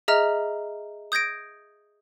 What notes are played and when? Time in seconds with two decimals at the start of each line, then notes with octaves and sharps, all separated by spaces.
0.08 G#4 D#5 E5 A#5 F6
1.12 D#6 G6 G#6 A#6 D7